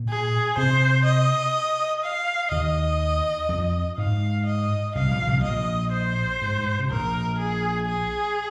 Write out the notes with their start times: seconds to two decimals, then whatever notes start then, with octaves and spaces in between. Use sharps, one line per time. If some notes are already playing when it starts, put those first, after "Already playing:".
Already playing: A#2 A#3
0.09 G#4
0.57 C3 C4 C5
1.06 D#5
2.03 F5
2.51 D#2 D#3 D#5
3.49 F2 F3
3.97 G#2 G#3 F5
4.46 D#5
4.95 C2 C3 F5
5.11 A#1 A#2
5.27 C2 C3
5.43 A#1 A#2 D#5
5.92 C5
6.42 G#2
6.58 G#2
6.79 C3
6.90 A#1 A#2 A#4
7.39 G#4
7.88 G#4